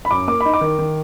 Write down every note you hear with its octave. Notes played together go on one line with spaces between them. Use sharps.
B5
F#2 D6
A#3 D6
D#4 B5
D6
D#3
D#3